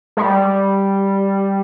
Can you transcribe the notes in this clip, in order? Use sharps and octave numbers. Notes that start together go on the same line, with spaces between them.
G#3
G3